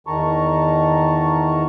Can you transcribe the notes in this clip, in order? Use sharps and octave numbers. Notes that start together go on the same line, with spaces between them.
E2 D#3 A5 A#5 C#6